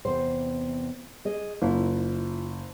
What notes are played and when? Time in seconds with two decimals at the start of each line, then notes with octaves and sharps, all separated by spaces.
0.05 E2 C3 C5
1.25 G#4 D#5
1.62 F#1 E4 F4